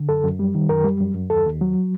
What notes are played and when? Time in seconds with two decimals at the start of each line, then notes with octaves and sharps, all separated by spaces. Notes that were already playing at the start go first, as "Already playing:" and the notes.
Already playing: D3
0.09 F#2 A4
0.24 F#2
0.39 G3
0.55 D#3
0.69 F#2 A#4
0.84 G3
1.00 F#2
1.15 F#2
1.30 D#2 A4
1.45 D#2
1.61 F#3